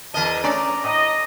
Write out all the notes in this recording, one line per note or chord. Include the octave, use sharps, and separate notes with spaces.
E2 A#4 D#5 A5
A3 C#4 D4 D5 A#5
A2 D#5